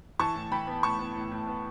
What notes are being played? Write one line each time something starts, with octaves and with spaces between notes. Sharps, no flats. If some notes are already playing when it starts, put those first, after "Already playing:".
E3 A5 C#6
A2
E3 G5 B5
B3
A2 A5 C#6
B3
A2
A2
B3